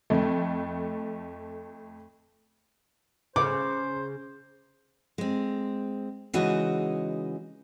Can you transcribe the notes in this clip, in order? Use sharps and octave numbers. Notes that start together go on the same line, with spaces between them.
F2 A3
C#3 C5 D6
G#3 C4
C#3 E3 G#3 D#4 F#4 D#5